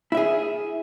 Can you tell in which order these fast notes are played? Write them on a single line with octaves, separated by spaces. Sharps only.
E4 E5 G#4